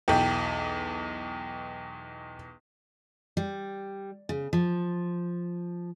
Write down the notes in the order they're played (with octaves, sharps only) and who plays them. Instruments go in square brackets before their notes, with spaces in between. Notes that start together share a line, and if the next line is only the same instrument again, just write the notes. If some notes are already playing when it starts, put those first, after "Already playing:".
[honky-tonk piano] B1 E2 [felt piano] G5
[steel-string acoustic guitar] G3
C#3
F3